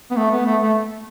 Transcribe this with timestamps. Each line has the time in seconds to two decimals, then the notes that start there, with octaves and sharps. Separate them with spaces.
0.11 B3
0.16 A3
0.31 B3
0.46 A3
0.62 A3